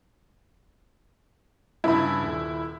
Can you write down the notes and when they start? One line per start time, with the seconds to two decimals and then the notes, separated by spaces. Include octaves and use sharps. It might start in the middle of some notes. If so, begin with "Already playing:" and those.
1.84 G2 C#3 E4 B5
2.22 D#1